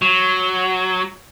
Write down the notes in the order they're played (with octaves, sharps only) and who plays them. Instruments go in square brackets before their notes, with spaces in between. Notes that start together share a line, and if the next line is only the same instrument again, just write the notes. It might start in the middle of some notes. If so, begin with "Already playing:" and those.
[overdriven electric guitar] F#3